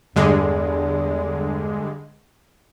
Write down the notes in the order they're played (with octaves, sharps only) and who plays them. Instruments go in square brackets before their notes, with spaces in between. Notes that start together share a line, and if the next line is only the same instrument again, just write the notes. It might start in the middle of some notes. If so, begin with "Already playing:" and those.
[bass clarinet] E2 [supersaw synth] G2 D3 G#3